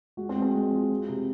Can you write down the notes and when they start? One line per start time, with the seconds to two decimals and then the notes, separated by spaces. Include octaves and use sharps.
0.17 G#3 F#4
0.29 C4
0.36 G#3
0.42 C4
0.55 G#3
0.72 F3
0.91 F2
1.08 C3